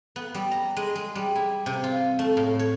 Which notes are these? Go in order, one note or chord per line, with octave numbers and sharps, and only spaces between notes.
B3
G3
A#5
G#3
G#3
G3
E4
C3
F4
A3
A2
C#5